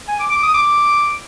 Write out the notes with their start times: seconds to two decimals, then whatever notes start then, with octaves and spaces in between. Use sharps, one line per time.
0.08 G#5
0.19 D6
0.31 D6
0.42 D#6
0.54 D6